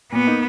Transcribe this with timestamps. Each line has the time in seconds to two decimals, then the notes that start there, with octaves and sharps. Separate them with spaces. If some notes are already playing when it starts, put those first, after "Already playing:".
0.12 A#2 B3
0.27 A#3 D#4